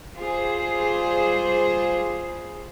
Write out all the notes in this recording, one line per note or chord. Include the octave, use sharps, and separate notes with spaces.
G3 F4 G#4 C5